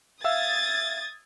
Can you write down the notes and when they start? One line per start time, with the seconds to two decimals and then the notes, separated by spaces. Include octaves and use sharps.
0.24 E5 F5 D#6 E6 G#6 A6